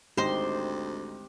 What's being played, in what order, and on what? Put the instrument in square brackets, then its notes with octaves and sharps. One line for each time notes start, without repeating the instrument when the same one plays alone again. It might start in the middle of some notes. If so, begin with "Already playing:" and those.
[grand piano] G#1 D#4 A#6 [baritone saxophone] D2 [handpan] G4 [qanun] C5 C6